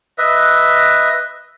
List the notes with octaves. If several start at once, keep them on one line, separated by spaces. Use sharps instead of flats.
B4 D#5 E5